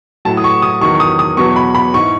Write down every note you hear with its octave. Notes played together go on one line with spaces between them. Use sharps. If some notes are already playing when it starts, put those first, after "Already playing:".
A2 F#3 A5
D#6
C#6
D#6
E2 D#3 F#3 C#6
D#6
D#6
E2 B2 F#3 C#6
B5
B5
G#2 E3 C#6